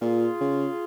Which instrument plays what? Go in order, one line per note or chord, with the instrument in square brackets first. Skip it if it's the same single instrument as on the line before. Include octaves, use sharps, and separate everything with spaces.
[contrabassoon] A#2 [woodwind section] F4 G#4
[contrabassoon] C#3